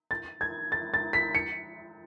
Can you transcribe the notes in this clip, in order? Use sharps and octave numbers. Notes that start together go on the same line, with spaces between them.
A6
G#6
A6
A6
B6
C#7